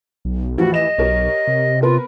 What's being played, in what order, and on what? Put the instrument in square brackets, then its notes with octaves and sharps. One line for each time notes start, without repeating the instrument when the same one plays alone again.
[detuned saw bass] B1
[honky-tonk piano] D#2 A2 F3 [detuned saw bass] E3 [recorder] F#4
[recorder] D#5 [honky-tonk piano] E7
[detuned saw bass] B1 [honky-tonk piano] G4 A#4 C#5
[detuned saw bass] C3
[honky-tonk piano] B3 A#4 B4 [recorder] F4